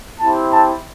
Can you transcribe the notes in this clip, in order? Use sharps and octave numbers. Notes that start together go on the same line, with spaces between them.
C4 E4 G4 A5
A5